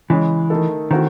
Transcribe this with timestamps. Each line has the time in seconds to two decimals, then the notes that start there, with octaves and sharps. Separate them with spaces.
0.10 C#3 E3 G#3 C#4
0.50 D#3 A3 D#4 A4
0.91 D#3 E3 A3 C4 F#4